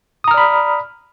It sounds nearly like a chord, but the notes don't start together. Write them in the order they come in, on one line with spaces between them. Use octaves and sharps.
D#6 A#5 F6 D5 B5